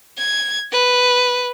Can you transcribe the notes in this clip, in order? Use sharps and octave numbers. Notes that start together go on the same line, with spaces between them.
G#6
B4